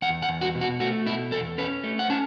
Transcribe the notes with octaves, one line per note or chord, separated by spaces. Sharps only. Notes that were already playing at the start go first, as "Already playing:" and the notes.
E2 F#5
F#5
E2
F#4
B2
F#4
A3 F#4
B2 E4
E2 A4
C#4 B4
A3
F#5
C#4 A5